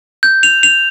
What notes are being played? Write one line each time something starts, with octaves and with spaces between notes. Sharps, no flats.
G6
F7
F7